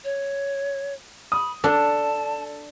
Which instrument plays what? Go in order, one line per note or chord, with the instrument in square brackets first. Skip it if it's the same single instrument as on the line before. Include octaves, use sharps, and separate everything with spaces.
[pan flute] C#5
[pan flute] B5 [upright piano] D#6
[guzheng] D4 [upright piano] A4 [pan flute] A5